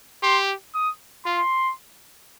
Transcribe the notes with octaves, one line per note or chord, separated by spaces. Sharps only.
G4 C6
D#6
F4 C6